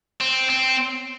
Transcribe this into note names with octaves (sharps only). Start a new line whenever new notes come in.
C4
C4